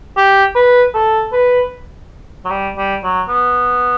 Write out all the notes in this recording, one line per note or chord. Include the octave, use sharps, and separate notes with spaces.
G4
B4
A4
B4
F#3
G3
G3
F#3
B3